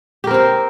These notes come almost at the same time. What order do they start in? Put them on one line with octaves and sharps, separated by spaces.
G4 A#4 C4 C5